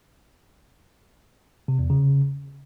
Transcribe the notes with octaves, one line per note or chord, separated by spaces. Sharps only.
C3
E2
C#3